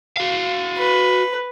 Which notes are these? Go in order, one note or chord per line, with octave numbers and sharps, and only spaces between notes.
F#4 F5
B4